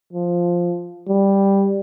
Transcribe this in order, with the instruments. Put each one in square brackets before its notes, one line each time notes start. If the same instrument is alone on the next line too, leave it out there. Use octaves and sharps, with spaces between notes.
[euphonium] F3
G3